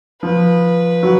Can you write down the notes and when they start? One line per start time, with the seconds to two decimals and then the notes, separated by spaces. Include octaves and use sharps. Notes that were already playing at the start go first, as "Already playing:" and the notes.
0.22 F3 B4
1.03 F#3